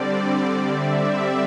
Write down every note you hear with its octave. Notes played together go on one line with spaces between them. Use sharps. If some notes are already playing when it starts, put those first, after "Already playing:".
Already playing: D3 G3 C4 D5
E5